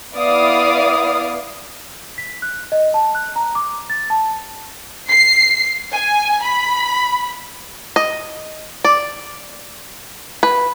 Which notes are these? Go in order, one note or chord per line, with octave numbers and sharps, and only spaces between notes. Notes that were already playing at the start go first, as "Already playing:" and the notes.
B3 E4 D5 F5 D6 D#6
B6
F#6
D#5
A5
F#6
A#5
D6
A6
A5
C7
G#5
B5
D#5
D5
B4